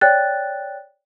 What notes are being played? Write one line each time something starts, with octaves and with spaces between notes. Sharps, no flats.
C#5 D5 G5 F#6 A6